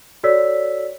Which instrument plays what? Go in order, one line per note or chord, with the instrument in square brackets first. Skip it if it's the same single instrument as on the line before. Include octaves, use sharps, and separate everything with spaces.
[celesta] F#4 A4 C#5 D5 E6 B6